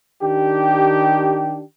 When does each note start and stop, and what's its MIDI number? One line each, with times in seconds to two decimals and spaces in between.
0.22 1.62 51
0.22 1.62 62
0.22 1.62 67